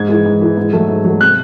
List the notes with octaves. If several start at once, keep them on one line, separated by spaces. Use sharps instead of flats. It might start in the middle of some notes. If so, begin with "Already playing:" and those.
Already playing: G#2 G#6
E3 G#3
G#2
E3 G#3
G#2
F#3 A3
G#2
F#3 A3
C3 F#6